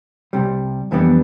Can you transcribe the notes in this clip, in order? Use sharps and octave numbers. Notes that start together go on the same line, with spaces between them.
C2 C3 G3
F2 E3 G3 B3 D4